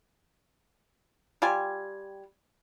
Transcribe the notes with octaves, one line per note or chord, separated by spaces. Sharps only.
G3 F4 G4 G#5